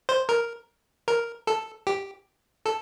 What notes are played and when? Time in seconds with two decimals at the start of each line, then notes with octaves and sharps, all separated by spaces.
0.09 C5
0.29 A#4
1.08 A#4
1.47 A4
1.87 G4
2.66 A4